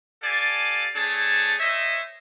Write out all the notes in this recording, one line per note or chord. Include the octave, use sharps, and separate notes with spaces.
G4 A4 D5 F5 G#5 A5
A3 D4 G#4 C#5 A5
C5 C#5 D#5 E5